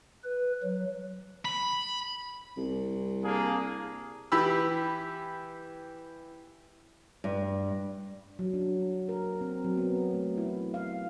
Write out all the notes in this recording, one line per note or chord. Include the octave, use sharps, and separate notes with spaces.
B4
F#3
B5
C2
A#3 D4 G#4
E3 G4 B5 E6
G2
F#3
D4
A#4
C4
F#3
B3
A3
E4
F5